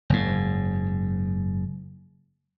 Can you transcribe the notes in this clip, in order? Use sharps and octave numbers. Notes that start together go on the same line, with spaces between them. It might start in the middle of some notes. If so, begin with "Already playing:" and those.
F#1 G#2